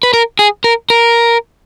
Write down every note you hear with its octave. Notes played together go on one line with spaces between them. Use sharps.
B4
A#4
G#4
A#4
A#4